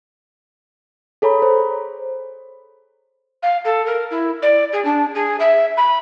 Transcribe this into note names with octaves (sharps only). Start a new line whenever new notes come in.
G#4 A4 C#5 A#5 B5
C5
F5
A4
A#4
E4
D5
G#4
D4
G#4
E5
B5